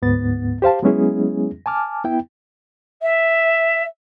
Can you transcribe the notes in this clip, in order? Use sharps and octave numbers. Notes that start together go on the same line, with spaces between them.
D2 G#2 B3 A6
G4 C5 F5 A5
F#3 G#3 B3 C#4 E4 G#4
G#5 A5 D6 F6
B3 E4 G5
E5